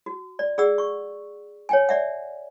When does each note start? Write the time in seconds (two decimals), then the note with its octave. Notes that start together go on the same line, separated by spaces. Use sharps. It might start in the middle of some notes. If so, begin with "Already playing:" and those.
0.06 F#4
0.39 D5
0.58 G#4 D5 F#5 E6
0.78 C#6
1.69 C#5 G5 G#5
1.89 D5 E5 F#5